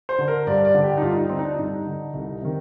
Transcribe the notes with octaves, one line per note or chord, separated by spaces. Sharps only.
C5
D3
A#4
G2 D5
D5
D3
G4
D#4
G2 F4
D#4
D3 C4
D#4
D4
G2 D#4
D3
C2
C3 D#3